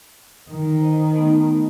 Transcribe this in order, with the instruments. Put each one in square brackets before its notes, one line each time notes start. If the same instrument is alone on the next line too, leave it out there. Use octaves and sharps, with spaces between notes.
[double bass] D#3
[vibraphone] C5 D#5
A3 B3 D#4